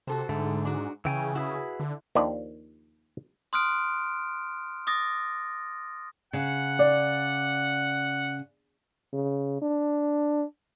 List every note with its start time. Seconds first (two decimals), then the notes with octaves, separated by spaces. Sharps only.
0.07 C3 F#4 A4 C5
0.29 G#2 D3 A3
0.65 D4 F#4
1.05 C#3 E3 C#4 G5 G#5
1.35 E4 F#4 G#4 B4
1.80 D3
2.15 D#2 D#3 F3 D4 G4 D5
3.53 C6 D#6 F6 F#6 D7
4.87 D6 D#6 A6 A#6
6.33 C#3 F#5
6.79 D5
9.13 C#3
9.62 D4